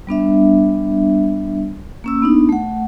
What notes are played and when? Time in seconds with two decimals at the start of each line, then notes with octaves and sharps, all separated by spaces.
0.07 G3 B3 D4 E5
2.04 A#3 C#4 E6
2.22 B3 D4 D#4
2.49 A3 F#5